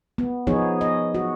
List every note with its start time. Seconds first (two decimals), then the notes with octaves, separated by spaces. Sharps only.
0.18 B3
0.47 F3 B3 D#4 G#4 C#5
0.81 D#5
1.15 F#4